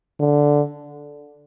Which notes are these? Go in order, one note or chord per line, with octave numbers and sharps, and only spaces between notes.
D3